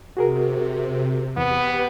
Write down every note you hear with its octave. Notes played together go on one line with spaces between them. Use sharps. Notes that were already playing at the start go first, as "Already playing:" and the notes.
C3 F#4 G#4 A#4
E2 B3 G4 B4